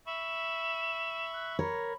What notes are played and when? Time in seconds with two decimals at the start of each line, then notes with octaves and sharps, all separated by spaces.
0.07 E5 B5 C#6 E7
1.33 F#6
1.59 A#4 C#5 B5